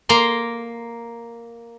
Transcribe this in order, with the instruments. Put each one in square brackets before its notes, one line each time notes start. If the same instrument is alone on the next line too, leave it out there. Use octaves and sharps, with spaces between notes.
[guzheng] A#3 A#5 C6